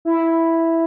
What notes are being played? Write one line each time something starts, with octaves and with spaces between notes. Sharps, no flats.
E4